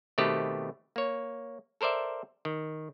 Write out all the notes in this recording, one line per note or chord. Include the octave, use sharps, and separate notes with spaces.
B2 D#3 A3 C4 G4 B4
A#3 C#5
A4 A#4 C5 D5 E5
D#3